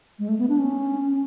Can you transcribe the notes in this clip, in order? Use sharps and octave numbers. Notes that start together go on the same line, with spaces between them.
G#3
A3
B3
D4
C#4